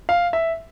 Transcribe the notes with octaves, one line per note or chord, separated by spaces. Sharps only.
F5
E5